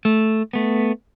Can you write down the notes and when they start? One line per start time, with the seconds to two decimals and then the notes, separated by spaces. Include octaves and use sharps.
0.05 A3
0.53 A3 B3